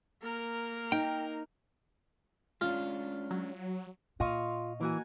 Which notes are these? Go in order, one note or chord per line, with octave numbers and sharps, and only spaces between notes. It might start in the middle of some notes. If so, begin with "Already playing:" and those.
A#3 A#4
D#4 G5
G#3 C#4 D4 F4
F#3
A#2 F4 D#5 F5 C#6
E3 A#3 F#4 G#5